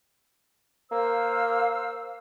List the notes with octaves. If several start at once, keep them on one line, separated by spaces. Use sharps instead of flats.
A#3 C5 F5 E6